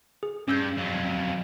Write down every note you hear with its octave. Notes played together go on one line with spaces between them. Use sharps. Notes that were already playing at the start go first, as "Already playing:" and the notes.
G#4
G2 C#4 E6 G6
F2 F#3